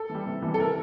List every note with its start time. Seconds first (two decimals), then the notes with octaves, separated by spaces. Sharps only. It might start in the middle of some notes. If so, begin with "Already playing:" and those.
Already playing: A4
0.10 E3 G3
0.26 C3
0.42 E3 G3
0.54 A4
0.60 A#4